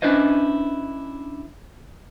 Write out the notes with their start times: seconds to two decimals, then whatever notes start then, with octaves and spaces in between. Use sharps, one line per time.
0.02 C#4 D4 E4 B4 C5 D#5